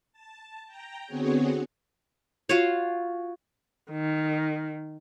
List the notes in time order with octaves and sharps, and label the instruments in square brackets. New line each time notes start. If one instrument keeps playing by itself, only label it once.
[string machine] A5
G5 A#5
D3 B3 C4 F#4 G#4 C#5
[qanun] F4 F#4 C#5
[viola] D#3